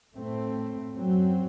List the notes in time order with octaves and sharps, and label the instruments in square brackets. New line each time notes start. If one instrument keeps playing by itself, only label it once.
[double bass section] A2 A3 C4
F#2 F#3 C4